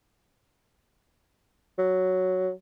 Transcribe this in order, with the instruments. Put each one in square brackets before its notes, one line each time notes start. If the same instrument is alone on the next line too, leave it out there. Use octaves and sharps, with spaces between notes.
[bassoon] F#3